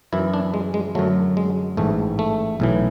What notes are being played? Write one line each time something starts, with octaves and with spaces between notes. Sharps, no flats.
F#2 E3 E4
D4
G#3
G#3
F#2 D3 F#3 A3
G#3
A1 G#2 E3 A3
A3
B1 A2 E3